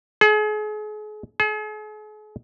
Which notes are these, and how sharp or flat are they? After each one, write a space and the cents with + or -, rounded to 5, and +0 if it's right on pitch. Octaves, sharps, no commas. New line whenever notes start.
G#4 +40
G#4 +45